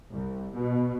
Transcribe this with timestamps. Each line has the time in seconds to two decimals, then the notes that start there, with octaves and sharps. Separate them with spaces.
0.13 C2
0.57 B2